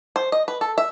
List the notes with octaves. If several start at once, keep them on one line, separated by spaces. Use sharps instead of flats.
C5
D#5
B4
A4
E5